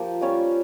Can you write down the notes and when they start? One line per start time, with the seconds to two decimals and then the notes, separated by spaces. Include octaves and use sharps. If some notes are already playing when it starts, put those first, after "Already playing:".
Already playing: F3 A#3 G4
0.21 G3 C#4 F4 C#5